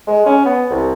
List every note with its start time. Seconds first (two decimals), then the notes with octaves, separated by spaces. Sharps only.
0.07 G#3
0.26 C#4
0.45 B3
0.70 C2